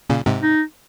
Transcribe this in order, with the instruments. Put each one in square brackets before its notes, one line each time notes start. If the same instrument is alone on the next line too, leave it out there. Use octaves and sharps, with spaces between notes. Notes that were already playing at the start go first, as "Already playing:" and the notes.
[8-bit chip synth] A#2 C#3
G#2 C3
[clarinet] D#4